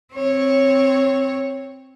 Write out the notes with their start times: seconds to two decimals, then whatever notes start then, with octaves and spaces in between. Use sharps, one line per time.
0.14 C4 C#5